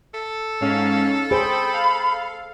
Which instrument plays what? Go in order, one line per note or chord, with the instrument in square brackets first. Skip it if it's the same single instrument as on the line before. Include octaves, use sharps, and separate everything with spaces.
[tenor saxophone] A4
[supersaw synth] G#2 C#4 F5
[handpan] G#4 C5 [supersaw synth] G5 [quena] B5
[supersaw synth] F5